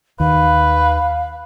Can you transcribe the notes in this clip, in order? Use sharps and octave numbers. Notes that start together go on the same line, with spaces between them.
D#2 D#3 B4 F5